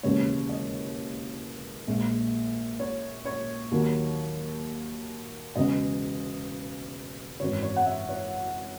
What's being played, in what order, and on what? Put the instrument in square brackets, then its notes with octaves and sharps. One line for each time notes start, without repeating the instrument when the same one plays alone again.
[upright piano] E1 D#2 C#3 E3 G#3 C#5
D#5
A#1 A#2 G#3
C#5
C#5
D#2 D#3 F#3 A#3
E1 E2 C#3 D#5
G#1 F#2 E3 C#5
C#5
F#5
E5
C#5